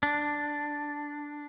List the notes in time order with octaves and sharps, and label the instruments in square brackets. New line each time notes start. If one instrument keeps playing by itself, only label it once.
[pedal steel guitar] D4